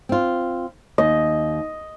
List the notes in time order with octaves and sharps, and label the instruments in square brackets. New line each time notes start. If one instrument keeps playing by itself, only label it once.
[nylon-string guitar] C4 F4
[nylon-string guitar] D#2 [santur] D#5